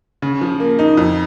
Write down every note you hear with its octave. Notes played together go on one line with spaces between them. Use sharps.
C#3
F3
A#3
D#4
F2